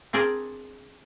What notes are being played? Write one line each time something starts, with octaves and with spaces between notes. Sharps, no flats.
C4 D4 G#4 A#4 D5